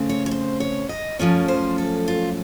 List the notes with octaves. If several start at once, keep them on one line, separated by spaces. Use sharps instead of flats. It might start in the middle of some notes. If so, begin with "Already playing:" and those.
Already playing: C#3 A3 C4
C#5
C#5
C5
C#5
D#5
F#2 F3 A3 C#4 C#5
C5
A4
F4